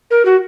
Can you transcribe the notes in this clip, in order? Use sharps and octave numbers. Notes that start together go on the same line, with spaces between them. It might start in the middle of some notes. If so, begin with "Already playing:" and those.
A#4
F#4